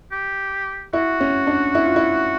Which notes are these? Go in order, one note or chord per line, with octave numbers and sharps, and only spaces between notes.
G4
E4 F#4
C#4
D4
E4
F4
E4